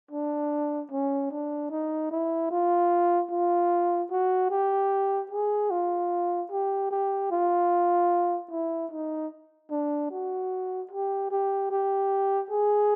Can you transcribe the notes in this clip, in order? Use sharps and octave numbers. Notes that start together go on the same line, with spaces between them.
D4
C#4
D4
D#4
E4
F4
F4
F#4
G4
G#4
F4
G4
G4
F4
E4
D#4
D4
F#4
G4
G4
G4
G#4